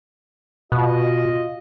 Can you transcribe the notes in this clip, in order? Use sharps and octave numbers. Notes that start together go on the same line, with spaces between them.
B2 F4 D#5